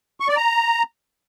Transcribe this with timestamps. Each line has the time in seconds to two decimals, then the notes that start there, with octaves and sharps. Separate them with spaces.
0.20 C#6
0.28 D5
0.37 A#5